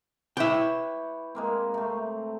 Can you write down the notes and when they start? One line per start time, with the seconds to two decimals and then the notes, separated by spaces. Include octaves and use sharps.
0.37 E4 G4 B4 C#5 G5
1.35 G#3 A#3 C4
1.74 C3 A3